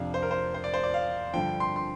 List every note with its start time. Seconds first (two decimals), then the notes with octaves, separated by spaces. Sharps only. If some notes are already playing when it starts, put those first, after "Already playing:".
Already playing: F2 C3 F3 D4 F5
0.14 C5
0.22 A#4
0.31 C5
0.54 C5
0.64 D5
0.74 C5
0.84 D5
0.94 F5
1.34 G2 D3 F3 G5
1.60 C6
1.76 C6